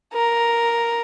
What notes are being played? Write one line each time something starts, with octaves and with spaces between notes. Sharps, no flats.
A#4